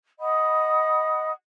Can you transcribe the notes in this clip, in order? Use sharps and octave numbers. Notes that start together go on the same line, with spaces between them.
D#5 F#5 B5 D#6